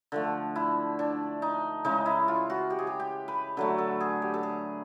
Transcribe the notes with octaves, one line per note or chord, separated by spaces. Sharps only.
D3 F3 A3
E4
D4
D#4
C#3 E3 G#3 D#4
E4
F4
F#4
G4
G#4
G4
G4
B4
D3 F#3 A3 B4
A4
G#4
G4
A4
G#4